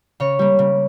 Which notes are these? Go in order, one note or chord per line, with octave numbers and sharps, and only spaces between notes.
C#3 C#5
G3 A#3
C#3